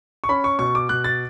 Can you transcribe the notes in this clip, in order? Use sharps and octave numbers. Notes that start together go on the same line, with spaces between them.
C#6
C#4 B5
C#6
B2 C#6
D6
B2 F#6
A6